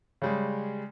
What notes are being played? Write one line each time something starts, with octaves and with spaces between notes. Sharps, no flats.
C#3 G3 G#3